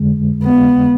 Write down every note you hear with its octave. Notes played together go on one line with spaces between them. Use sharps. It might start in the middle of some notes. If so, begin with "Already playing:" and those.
Already playing: F2 D3 G#3
B3